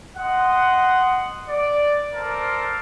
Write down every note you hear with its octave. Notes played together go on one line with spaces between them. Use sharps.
D#5 F#5 C6
D5
A4 A#4 C5 D5 F5 A5